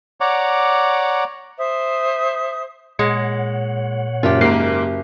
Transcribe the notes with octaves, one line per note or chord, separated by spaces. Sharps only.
C#5 D5 F#5 A#5 D6
C5 E5 D#6
A#2 G#3 C#5 F#5
F#1 F4 G4
G#2 A#3 G4 C7